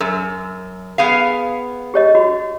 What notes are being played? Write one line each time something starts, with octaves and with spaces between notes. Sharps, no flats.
F#2 A#4
B3 G#4 F5
G4 C#5 D#5
F#4 B5